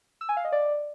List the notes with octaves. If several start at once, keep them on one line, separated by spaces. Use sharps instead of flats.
E6
G#5
F5
D#5
D5